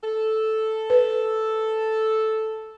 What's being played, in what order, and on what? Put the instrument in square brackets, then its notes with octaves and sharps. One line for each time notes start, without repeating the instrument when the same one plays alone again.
[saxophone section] A4
[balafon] B4